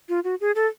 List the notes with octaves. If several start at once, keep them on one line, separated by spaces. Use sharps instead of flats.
F4
F#4
G#4
A4